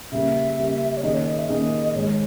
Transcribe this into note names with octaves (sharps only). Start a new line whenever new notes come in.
C#3 G3 A#3 E5
C#3 G3 A#3
C#5
D#3 A#3 C#4 G#4 D#5
C#5
D#5
E5
D#3 A#3 C#4 G#4 D#5
G#2 D#3 G#3 C#5